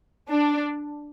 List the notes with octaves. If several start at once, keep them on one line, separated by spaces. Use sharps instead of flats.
D4